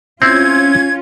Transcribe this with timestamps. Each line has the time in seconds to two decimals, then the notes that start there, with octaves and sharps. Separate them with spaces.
0.22 C4 C#4 E4 F4 G#6